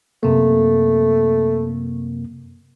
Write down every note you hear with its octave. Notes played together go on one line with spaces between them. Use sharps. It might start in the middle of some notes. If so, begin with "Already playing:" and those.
F#2 C3 A3 A#3